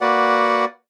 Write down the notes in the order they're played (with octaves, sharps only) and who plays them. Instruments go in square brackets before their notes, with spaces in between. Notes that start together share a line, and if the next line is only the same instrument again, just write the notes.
[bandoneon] A#3 F#4 B4 D5 F#5